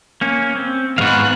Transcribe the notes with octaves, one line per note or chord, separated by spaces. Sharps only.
A#3 C#4
C4
D#2 G#2 B3 F5 C#6 F#6